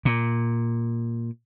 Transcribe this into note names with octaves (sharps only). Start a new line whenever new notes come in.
A#2